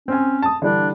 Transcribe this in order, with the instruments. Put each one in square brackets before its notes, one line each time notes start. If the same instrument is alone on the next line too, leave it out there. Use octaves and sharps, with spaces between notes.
[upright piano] C4 G#5 [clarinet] C#4
[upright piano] A5 D#6
[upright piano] D3 E3 G3 [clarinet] D4